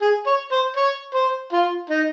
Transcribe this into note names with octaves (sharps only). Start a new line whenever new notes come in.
G#4
C#5
C5
C#5
C5
F4
D#4